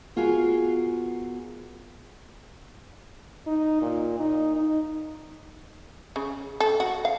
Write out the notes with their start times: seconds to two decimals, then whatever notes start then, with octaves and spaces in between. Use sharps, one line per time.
0.16 B3 F4 F#4 G#4 A#4
3.47 D#4
3.82 A#2
4.20 D#4
4.56 D#4
6.16 C#3
6.60 A4
6.80 F#4
7.05 F5